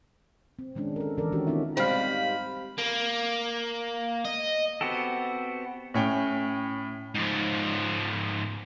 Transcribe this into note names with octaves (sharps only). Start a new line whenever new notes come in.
C4
D#3 G#3 C#4 D4
A4 A#4
D#3 E3 A4 A#4 D5
C#4 D4 F#4 G4 A#4
D#3 B3 C#4 D#4 F4 E5
G#2 G3 C4 F5 B5
A#3
D#5
B3 C4 F#4 G4 A4
A2 C#4 G5
G#2 F3